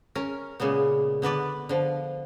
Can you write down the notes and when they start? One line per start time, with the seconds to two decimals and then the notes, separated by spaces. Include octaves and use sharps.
0.15 C#4 A#4
0.60 A#2 C#3 G#3 B3
1.22 D3 B3 B4 D5
1.69 D3 F3